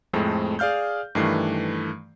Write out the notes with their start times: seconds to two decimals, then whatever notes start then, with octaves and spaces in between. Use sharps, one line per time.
0.13 F2 A2 G#3 A3 C4
0.59 G#4 D5 F5 F6 G6
1.15 G2 D#3 E3 A3 C7